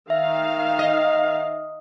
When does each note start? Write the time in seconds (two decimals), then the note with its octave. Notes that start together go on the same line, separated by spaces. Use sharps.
0.10 D#3 E5 F5
0.79 D#5